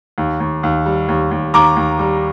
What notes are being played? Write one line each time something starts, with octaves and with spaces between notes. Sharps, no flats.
D#2
D#2
D#2
G3
D#2
D#2
D#2 A#5 D6
D#2
G3